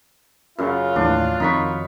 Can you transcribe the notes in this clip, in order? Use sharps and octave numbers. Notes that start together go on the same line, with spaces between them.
F#2 C#3 F4 F#5
D#2 A2 E3 D4
F2 D#3 D#4 B5 C#6